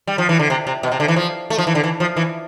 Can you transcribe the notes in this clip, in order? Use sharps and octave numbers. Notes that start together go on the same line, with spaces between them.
G3
F3
E3
D3
C3
C3
B2
C3
D3
E3
F3
A3
F3
E3
D3
E3
F3
E3